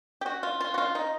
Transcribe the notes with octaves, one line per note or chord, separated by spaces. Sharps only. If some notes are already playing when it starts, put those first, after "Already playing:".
G4
F#4
F4
F4
F#4
F4
D#4